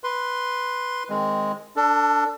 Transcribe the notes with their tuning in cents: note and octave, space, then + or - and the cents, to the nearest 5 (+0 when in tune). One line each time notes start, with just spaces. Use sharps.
B4 +0 C6 +0
D#3 +0 G#3 +0 C4 +0
D4 +0 A4 +30